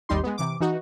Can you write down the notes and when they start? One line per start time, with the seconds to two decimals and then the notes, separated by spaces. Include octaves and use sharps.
0.09 G#1 D#2 G3 D#4 C6
0.23 G#3 B3
0.38 C3 E3 D6
0.60 E3 D#4 F#4